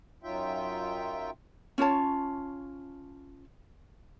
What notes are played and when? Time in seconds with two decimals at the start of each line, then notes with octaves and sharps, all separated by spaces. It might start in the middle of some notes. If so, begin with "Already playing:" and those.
0.23 F#2 F#3 D#4 F4 E5 G5
1.78 C#4 F4 C#5 A5